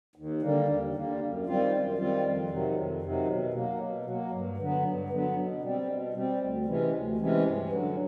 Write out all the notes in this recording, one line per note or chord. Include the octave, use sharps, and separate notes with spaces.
D#2
D3 G3 A#3
D#2
D3 G3 A#3
F#2
D#3 G3 C4 F4
F#2
D#3 G3 C4 F4
F2
C3 D#3 F#3
F2
C3 D#3 F#3
B2
F#3 A#3
B2
F#3 A#3
G2
D3 F#3 B3
G2
D3 F#3 B3
B2
G3 C4
B2
G3 C4
D2
C3 E3 G#3 C#4
D2
C3 E3 G#3 C#4
G2
D3 F#3